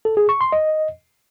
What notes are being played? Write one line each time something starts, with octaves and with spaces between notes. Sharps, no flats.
A4
G#4
C#6
C6
D#5